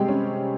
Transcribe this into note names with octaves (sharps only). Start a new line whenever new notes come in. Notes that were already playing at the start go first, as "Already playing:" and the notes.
Already playing: C3 G3 G#3 C4 G4 G#4
C#4